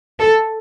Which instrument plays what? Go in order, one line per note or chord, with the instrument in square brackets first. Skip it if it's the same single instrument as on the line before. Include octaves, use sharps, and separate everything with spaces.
[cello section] A4